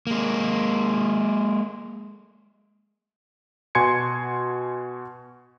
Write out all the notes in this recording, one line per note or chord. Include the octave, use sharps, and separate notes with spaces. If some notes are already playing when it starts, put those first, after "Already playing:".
G#3 A#3
B2 F#4 G#5 C6 G#6 C#7